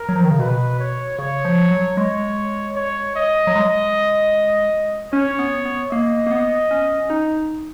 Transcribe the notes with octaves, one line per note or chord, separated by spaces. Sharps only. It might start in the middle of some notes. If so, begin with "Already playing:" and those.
Already playing: A#4
F#3
F3
D#3
C#3
B2 B4
C#5
C#3 C#5
F3
F#3
G#3 C#5
C#5
D#5
F#3
G#3 D#5
C#4 C#5
B3
B3
A#3 D#5
A#3
B3
C#4
D#4